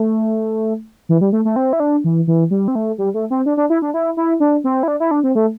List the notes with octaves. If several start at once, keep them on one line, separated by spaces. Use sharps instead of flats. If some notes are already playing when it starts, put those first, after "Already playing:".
Already playing: A3
E3
G3
A3
A3
C4
E4
D4
E3
E3
G3
C4
A3
G3
A3
C4
D4
D4
E4
D4
E4
E4
D4
C4
E4
D4
E4
D4
C4
A3